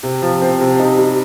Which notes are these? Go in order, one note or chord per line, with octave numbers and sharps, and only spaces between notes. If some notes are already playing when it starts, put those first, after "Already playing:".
C3
F3
C4
C3
D#4
G3